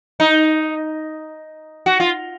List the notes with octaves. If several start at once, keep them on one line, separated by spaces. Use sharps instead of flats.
D#4
F#4
F4